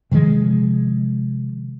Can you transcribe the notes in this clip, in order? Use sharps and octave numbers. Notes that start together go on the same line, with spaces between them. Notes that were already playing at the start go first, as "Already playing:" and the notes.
C3 D#3 F3 G#3